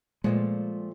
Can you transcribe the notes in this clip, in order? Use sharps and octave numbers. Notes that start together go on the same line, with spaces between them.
A#2 F3 G#3 A3